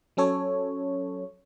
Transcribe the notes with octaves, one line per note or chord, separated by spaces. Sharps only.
F#3 C#4 A4 C#5